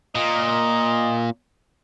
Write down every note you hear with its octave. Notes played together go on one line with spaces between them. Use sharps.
A#2 D#5